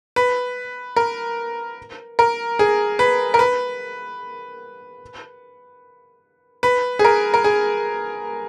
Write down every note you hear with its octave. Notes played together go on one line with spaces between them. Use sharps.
B4
A#4
A#4
G#4
B4
A#4
B4
B4
G#4
A#4
A#4
G#4